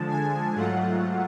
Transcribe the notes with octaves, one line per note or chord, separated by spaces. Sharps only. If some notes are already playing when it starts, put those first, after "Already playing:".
Already playing: D3 F3 G#3 A5
G#5
G#2 F#3 A3 F4 F#5